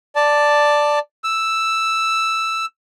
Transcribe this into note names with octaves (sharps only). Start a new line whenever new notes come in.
D5 A5
E6